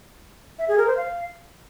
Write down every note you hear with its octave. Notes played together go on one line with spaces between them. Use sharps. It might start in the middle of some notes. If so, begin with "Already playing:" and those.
E5
G#4
A#4
C5
F5